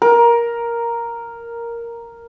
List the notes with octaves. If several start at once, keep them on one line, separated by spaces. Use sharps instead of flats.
A#4